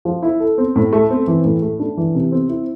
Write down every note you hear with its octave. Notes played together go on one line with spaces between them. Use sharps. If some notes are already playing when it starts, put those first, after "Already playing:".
F3
E4
A4
C4
A2
A3
C4
E3
A2
A3
D4
E3
C3
C4
E4